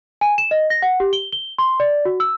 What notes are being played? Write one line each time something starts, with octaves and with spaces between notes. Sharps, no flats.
G#5
E7
D#5
A#6
F#5
G4
G7
G7
C6
D5
F#4
E6